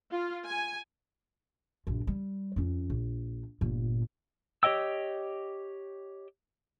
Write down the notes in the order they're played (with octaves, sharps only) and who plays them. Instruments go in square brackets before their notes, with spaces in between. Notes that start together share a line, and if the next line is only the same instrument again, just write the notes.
[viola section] F4
G#5
[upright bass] A#1 F#2
G3
F2 C#4
A#1
G1 A#2
[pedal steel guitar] G4 C#5 D#5 G5 E6